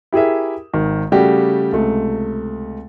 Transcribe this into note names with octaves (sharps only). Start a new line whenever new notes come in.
E4 G4 G#4 A#4 E5
G#1 D#3
C#3 G3 A3 F#4 G4
C#2 C3 A3